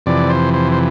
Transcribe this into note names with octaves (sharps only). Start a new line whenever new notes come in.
F2 C3 E3 D5
C5
C5
C5